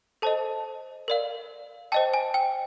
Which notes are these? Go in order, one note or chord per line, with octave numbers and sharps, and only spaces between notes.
A4 C5 D#5 A5
A#4 D5 F5
C5 D#5 G5 A5
G#5
G5